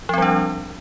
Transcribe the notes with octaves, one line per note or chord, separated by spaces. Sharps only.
F3 G3 C4 D4